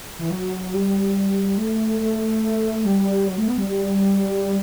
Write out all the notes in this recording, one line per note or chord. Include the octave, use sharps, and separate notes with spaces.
E3
F#3
G3
A3
A3
G3
F#3
A3
B3
G3
G3